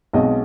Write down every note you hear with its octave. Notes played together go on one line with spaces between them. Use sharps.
B1 B2 G#3 C4 D#5